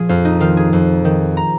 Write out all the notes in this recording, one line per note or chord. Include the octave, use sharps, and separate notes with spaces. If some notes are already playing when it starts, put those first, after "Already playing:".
Already playing: A#2 F3 G#4
F2 F4
D#4
D#3 F4
G#4
F2
D#3
A#5